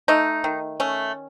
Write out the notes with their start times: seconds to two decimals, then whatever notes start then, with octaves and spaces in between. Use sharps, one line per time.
0.08 A3 D#4
0.44 D#3
0.80 A3 C#4